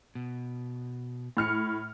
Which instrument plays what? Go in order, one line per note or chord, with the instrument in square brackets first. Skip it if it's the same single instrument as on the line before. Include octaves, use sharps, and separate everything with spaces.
[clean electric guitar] B2
[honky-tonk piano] A2 F6 C#7